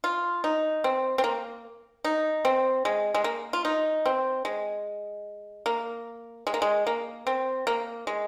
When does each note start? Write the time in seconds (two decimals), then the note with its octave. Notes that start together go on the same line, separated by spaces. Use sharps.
0.04 F4
0.44 D#4
0.84 C4
1.18 C4
1.24 A#3
2.04 D#4
2.45 C4
2.85 G#3
3.14 G#3
3.24 A#3
3.53 F4
3.65 D#4
4.06 C4
4.45 G#3
5.66 A#3
6.47 G#3
6.54 A#3
6.62 G#3
6.87 A#3
7.27 C4
7.67 A#3
8.07 G#3